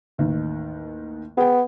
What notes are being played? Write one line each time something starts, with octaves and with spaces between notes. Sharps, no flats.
A1 D#2 D#3
B3 G#4 G5